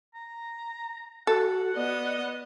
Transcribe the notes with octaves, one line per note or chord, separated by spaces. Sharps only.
A#5
F#4 A4 F#5
B3 D5 D#5